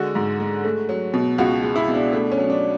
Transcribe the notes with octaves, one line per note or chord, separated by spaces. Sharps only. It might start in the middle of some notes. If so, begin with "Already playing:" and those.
Already playing: D3 G#3 F#4
G#2
G#3
A3
F#3
B2
C#2 F#4
G#3
E4
B2
D4
A3 D4
C#4
F#3
D4